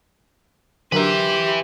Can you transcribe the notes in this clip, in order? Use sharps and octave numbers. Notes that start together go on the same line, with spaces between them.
D3 F#3 G4 A#4 B4 E5 C6